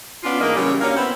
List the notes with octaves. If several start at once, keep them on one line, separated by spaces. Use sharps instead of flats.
B3 C#4 D4 F4
G#2 E3 A#3 D4 A#4 D#5
C#3 E3 F#3 G3
F#2 A#3 C#4 D4 F5
B3 C4 E4 C5